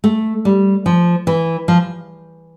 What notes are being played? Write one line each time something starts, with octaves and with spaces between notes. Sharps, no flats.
A3
G3
F3
E3
F3